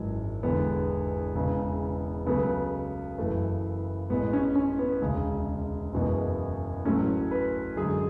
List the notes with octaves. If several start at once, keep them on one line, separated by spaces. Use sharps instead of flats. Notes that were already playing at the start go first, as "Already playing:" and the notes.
Already playing: G#1 F#2 E3 G#3
E1 E2 D3 B3
E1 E2 C#3 E3
C#2 C#3 F#3 A3 B3
F#1 F#2 E3 A3
A1 A2 G#3 B3
C#4
C#4
B3
E1 D2 C#3
F#1 E2 B2 G#3
A1 A2 F#3 A3 C#4
B4
F#2 D3 G#3 G#4